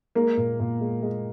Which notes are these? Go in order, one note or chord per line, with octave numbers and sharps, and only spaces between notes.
G#3 A#3
A#2
A#2
G#3
G#3